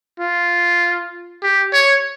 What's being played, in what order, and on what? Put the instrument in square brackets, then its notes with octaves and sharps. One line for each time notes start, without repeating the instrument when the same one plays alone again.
[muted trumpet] F4
G4
C#5